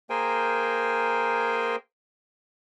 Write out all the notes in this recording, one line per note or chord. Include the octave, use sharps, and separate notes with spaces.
A#3 G#4 A#4 C5 G5 G#5